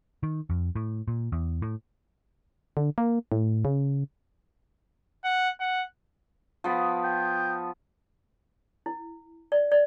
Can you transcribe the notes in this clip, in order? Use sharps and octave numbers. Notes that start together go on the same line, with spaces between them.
D#3
F2
A2
A#2
E2
A2
D3
A#3
A2
C#3
F#5
F#5
F3 B3
G5
E4
D5
D5